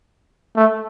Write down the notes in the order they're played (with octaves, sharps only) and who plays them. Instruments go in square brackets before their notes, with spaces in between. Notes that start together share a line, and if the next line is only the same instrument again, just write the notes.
[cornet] A3